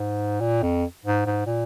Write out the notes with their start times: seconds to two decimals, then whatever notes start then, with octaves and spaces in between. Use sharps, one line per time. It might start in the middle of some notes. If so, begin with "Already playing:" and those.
Already playing: G#2
0.41 A#2
0.62 F2
1.05 G#2
1.26 G#2
1.46 A#2